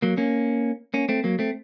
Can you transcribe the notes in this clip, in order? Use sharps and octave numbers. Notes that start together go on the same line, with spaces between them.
F#3 A#3
A#3 C#4
A#3 C#4
A3 C4
F#3 A#3
A3 C4